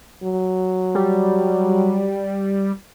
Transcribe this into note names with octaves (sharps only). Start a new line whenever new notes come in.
F#3
G3